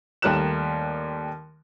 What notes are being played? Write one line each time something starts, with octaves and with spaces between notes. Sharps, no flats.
D#2 G3 A3 A#4 F#6 E7